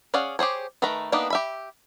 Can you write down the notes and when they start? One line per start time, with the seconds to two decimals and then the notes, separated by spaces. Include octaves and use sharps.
0.14 C#4 G#4 D5 F5 F#5
0.39 G4 G#4 C5 C#5
0.82 D#3 A3 A#4 B4 A#5
1.12 A#3 B3 D4 D#4 G4
1.30 G4 E5 B5